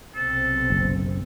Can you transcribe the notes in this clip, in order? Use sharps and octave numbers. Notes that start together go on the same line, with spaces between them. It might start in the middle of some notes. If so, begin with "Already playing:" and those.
B1 C3 C4 A4
F#1